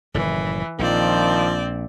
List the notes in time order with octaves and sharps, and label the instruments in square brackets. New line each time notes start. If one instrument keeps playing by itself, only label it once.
[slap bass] F#1 A2 D#3 [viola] E3
[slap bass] A#1 A#2 [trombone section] D#3 F3 [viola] C4 D5